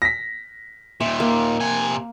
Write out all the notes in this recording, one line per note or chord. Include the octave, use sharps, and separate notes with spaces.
A#6 B6
D#2 A#2 E5
A#3
C3 G#5